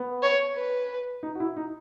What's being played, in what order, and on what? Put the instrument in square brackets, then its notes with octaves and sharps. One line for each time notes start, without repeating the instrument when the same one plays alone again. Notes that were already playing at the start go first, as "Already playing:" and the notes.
Already playing: [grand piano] B3
[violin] C#5
B4
[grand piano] D#4
F#4
E4
D#4